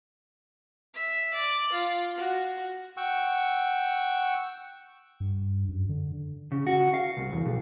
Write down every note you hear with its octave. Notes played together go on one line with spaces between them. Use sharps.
E5
D5
F4
F#4
F#5 G5 C#6 E6
G2
F#2
D3
C#3
F#4
F5
C2
E2
B1